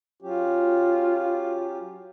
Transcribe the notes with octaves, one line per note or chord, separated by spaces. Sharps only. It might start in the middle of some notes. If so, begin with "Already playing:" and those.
F#3 C#4 F4 G4